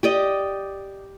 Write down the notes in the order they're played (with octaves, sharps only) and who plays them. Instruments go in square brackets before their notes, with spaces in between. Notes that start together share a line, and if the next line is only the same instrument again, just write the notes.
[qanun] G4 D5 D#5